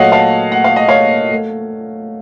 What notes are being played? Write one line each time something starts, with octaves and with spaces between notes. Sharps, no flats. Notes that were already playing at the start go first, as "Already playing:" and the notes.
Already playing: A#2 F#3 A3 C#5 D#5 F5 F#5
F5 A5
F#5
F5
D#5
C#5 F5
A3